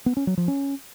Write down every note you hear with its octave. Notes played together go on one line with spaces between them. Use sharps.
B3
C#4
F#3
F3
C#4